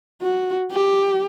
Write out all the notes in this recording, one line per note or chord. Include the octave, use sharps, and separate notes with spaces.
F#4
G4